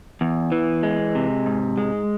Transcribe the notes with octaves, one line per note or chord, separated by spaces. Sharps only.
E2
E3
G#3
C3
G#2
G#3